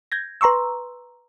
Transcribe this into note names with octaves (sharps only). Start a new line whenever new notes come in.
G6 G#6 A#6
B4 A#5 C6 C#6 E6